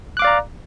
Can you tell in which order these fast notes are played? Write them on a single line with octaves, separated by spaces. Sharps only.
F#6 D6 F5 D5 A#5